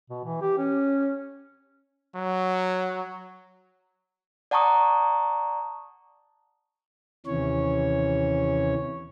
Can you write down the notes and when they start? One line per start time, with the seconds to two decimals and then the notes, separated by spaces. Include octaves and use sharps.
0.10 B2
0.25 E3
0.42 G4
0.58 C#4
2.16 F#3
4.51 D5 F#5 A5 A#5 C#6 D#6
7.26 D#2 C3 E3 C#4 C#5